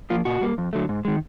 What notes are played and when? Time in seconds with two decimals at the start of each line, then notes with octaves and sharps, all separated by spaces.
0.10 F3 A#3 F4
0.25 A#2 F#4
0.41 G3 A#3
0.58 F2
0.73 D3 F#3 A3
0.89 G#2
1.05 D#3 G#3